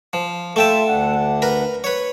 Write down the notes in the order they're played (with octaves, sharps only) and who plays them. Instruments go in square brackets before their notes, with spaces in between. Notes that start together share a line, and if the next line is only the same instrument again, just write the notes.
[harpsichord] F3
[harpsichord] A3 G5 A5 [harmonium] F4 A4 E5
[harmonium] D2 D4 F#5
[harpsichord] A#4 B4 A#5
B4 C#5